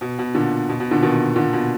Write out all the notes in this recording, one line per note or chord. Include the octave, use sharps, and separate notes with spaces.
B2
B2
A#2 D3
B2
B2
A#2 D3
B2 D#3
A#2 D3
B2